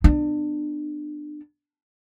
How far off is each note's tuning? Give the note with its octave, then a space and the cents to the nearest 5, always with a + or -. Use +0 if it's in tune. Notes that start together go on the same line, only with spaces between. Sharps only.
B3 +15 D4 +25